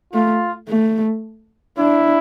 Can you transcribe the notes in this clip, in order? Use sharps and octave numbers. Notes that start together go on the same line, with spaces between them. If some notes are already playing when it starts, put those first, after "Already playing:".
A3 F4
A3
D4 E4